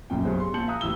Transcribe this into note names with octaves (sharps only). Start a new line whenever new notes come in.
B1 F#2 A#2 G5
G2 B2 F#3 G#4 C5
C6
A#1 A#2 A5 G6 C#7 F#7
E5 F5 A#5 D#6 F#6
D#1 A1 E4 E6 G7